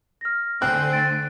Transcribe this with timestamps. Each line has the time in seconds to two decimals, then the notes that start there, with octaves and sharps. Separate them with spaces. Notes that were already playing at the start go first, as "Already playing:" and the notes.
0.21 F6 A#6
0.62 D3 A3 C4 G#5 F#6
0.92 A6 D7